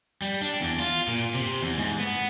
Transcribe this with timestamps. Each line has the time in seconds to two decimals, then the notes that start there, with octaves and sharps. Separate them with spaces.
0.22 G3
0.42 D4
0.60 E2
0.79 F4
1.08 A#2
1.34 C3
1.62 E2
1.78 G#2
1.99 B3